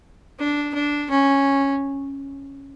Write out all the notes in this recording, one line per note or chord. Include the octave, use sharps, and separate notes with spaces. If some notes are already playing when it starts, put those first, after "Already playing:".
D4
D4
C#4